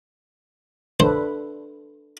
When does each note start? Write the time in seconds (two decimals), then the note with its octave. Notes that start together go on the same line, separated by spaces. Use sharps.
1.00 D4 A4 B4 C5